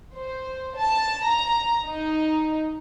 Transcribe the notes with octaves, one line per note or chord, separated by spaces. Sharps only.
C5
A5
A#5
D#4